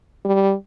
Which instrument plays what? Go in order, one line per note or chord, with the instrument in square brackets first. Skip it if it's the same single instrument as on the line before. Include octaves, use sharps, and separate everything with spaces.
[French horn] G3